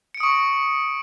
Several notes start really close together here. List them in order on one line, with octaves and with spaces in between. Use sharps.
C#7 D7 D#6 C#6